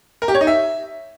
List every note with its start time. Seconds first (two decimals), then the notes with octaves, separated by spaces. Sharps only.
0.22 A#4
0.28 G4
0.35 C#5
0.41 D#4
0.47 E5